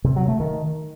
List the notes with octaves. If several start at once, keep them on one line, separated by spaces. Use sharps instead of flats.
C3
F#3
A3
D#3